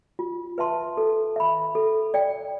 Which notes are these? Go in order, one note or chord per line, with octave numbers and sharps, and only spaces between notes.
F4
B4 E5 A5 C6
A4
E5 B5
A4
D5 G5